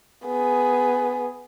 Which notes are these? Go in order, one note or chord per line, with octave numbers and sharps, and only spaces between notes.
B3 G#4